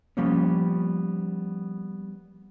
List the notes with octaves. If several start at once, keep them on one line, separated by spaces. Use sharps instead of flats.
F3 G3 A#3 B3 C#4